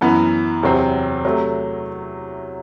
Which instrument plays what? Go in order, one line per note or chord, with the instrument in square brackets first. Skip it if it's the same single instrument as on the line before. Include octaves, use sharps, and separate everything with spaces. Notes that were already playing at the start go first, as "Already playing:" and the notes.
[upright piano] F#2 E3 B3
E2 C3 F#3 C4
C3 F#3 A3